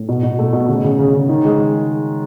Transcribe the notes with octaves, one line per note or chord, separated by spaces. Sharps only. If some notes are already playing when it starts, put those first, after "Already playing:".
Already playing: A2
B2
B2
A3
B2
C#3
C#3
C#3
C#3
D#3
G#3